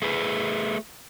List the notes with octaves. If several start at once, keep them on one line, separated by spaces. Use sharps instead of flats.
A3 G#4 B4